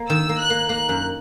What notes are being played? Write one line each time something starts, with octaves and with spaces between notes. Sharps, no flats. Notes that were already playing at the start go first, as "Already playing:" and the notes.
Already playing: A#3
D#3 E6
A#3
F#6
A#3
A#3 F#6
F#2